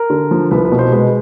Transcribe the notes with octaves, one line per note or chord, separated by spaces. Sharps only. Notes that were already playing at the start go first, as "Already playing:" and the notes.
Already playing: A#4
D3
F3
C2 B4
B4
B2
C5
G#3 B4